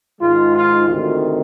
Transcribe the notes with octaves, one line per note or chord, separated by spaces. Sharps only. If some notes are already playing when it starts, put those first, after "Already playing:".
G#2 D#3 G#3 F4
F4
D2 C3 D#3